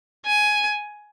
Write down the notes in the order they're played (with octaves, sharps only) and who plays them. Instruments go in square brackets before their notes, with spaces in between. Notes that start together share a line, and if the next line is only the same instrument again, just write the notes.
[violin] G#5